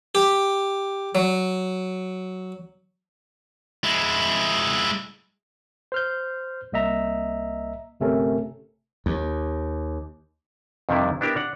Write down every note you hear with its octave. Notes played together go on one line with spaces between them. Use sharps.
G4
F#3
G#3 E4
C5 F6 G6
C2 A#3 D#5 E5 A#5
G1 C3 A3 C#4 A4 A#4
D#2
F2 C3 D#3 G3 D4 E4
B3 D4 E4 G4 A#4 E5
D4 F#5